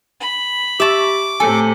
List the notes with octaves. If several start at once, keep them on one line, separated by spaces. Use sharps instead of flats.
B5
G4 E5 A5 C#6 D6
A2 C3 A4 G#5 C#7